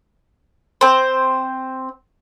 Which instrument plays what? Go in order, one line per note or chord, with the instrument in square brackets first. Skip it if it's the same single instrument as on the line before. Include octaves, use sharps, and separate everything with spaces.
[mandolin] C4 C5